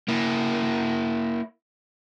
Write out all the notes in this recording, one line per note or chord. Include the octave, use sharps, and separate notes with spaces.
A#3 E4